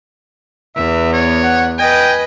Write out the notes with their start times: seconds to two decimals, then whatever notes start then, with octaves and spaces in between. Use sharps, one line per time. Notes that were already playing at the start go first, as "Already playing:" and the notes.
0.76 E2 B3 E5
1.13 C#5
1.44 F#5
1.79 B4 D#5 G5 G#5